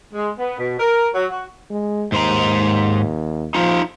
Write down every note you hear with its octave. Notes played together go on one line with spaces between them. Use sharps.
G#3
B3
B2
A#4
F#3
F#4
G#3
D#2 G#2 C5 A#5
F3 D#4 F4